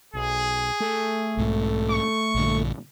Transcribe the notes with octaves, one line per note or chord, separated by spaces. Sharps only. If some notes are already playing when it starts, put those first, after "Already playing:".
B1 G#4
A3
B1 G#2
C#6
A#1 G2 D3